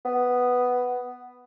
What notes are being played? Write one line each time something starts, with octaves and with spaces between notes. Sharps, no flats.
B3